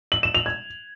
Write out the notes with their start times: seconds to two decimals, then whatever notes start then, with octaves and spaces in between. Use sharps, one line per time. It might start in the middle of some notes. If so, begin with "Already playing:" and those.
0.12 F#7
0.23 E7
0.35 F7
0.46 G#6